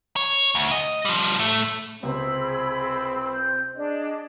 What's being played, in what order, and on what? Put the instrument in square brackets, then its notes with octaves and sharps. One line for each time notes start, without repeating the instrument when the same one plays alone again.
[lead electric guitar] C#5
D2
D#5
F3 G3
A2 A3
[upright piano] C#2 C3 C5 [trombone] C4 [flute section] G#4 B5 E6
[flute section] G6
D4 G#4 D#5